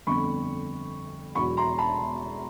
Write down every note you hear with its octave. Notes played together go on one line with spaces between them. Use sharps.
G1 F2 D3 B5 C#6
E1 E2 B2 F#3 B5 C#6
A#5 C6
A5 B5